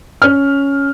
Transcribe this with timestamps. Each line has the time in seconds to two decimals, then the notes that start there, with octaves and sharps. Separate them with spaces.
0.22 C#4 F6